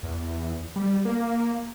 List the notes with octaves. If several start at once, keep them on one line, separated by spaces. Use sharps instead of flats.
E2
G3
A#3